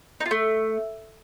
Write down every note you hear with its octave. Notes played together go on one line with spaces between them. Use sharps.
D#4
F4
A3